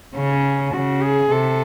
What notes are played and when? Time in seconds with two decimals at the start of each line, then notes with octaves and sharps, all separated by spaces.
0.15 C#3 C#4
0.73 C#3 F#4
1.02 G#4
1.31 C3 A4